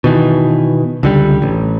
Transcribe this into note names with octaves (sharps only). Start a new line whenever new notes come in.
B2 D#3 E3
C#2 D3 G3
A1